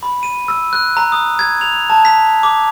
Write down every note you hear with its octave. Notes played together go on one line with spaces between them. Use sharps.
B5
D#7
E6
F#6
A#5
D#6
G#6
F7
A5
B6
D6